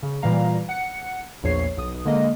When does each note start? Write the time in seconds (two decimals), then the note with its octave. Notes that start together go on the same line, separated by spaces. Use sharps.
0.03 C#3
0.22 A#2 E3 G3 F5 A#5
0.69 F#5 C#7
1.43 A#1 E2 C#5 C7
1.77 B1 D#6
2.05 D3 G#3 A#3 D#5